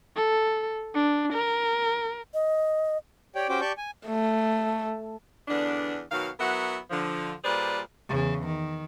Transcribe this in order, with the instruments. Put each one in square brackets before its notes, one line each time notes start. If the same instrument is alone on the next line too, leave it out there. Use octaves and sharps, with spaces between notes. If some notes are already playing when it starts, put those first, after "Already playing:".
[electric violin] A4
D4
A#4
[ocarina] D#5
[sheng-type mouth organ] G4 C#5 D5 G5
C#4 F#4 G4 C5 G5 D6
G4 D5 A5 C#6 G6
G#5
[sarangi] A3
[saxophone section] E2 D3 B3 D4
B2 D#3 F#3 F5
F#3 B3 E4 F#4 A#4 F#5
D3 F3
A#2 G3 G#4 B4 C5 D5
[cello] E2 C#3
D#3